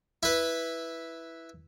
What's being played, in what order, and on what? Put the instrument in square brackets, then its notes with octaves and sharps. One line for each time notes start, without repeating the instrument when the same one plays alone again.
[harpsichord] E4 B4